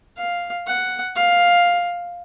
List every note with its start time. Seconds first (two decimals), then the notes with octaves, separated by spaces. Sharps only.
0.18 F5
0.67 F#5
1.16 F5